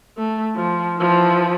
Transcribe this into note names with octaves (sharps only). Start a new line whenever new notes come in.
A3
F3
E3 F3